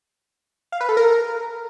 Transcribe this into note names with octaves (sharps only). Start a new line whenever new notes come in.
F5
B4
A4
A#4